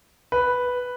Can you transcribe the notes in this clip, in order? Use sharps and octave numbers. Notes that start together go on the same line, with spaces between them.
B4